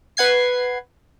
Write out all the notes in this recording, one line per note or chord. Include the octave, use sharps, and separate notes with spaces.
B4 F#5 G#6 C7